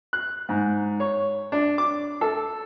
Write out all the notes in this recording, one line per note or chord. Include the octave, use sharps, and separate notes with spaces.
F#6
G#2
C#5
D4
D6
A4